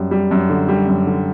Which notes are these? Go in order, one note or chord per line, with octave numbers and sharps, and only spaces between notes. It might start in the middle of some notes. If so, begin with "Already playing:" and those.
Already playing: F#2 G3
G3
F#2
D3
G3
F#2
D3